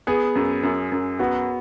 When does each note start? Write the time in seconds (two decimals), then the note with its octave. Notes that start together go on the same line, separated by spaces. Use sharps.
0.07 B3 G#4
0.35 F#2
0.63 F#2
0.92 F#2
1.19 B3 F#4